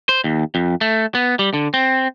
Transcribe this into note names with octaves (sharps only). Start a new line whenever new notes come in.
C5
D#2
F2
A3
B3
G3
D3
C4